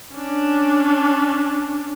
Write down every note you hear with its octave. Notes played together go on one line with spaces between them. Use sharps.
C#4 D4